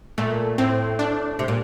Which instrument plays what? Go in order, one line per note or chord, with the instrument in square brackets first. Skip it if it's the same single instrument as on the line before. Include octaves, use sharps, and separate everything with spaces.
[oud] A#2 [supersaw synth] A3
[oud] A2 [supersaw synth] C4
[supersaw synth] D4
[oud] C3
A#2